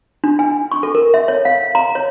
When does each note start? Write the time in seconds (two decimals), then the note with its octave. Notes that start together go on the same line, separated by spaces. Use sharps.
0.24 D4
0.39 G#5
0.72 C#6
0.83 A4
0.95 A#4
1.14 E5
1.28 C#5
1.45 F5
1.75 A#5
1.95 C#5